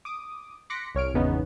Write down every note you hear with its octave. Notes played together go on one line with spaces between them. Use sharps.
D6 D#6
C6 D6 F#6 A#6 B6 C#7
C2 C#5 F6 D7
G#1 E2 C#3 B3 C#4 D#4